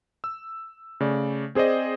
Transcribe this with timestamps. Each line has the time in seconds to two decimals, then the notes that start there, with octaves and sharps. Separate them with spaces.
0.24 E6
1.00 C#3 A3 D5
1.55 C4 G#4 C5 D5 D#5